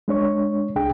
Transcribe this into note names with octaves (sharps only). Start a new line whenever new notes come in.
G#3 D4 C#5 C#6
C2 D4 G#4 G5